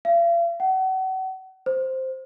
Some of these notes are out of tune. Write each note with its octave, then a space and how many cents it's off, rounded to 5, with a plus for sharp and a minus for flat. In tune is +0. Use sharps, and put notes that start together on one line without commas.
F5 -45
F#5 +35
C5 +0